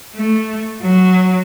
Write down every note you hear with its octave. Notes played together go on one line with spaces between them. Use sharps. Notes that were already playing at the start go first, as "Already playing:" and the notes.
A3
F#3